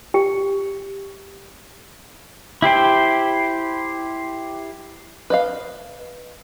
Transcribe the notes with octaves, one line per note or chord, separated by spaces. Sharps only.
G4 G5
E4 G4 C5 G5
B4 D#5 F5